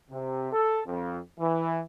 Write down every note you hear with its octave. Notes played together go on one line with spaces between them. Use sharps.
C3
A4
F2
E3